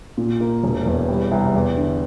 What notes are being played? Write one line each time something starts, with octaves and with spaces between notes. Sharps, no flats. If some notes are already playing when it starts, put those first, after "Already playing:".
A#2
A#3
E1
E2
G3
C2
E2
D3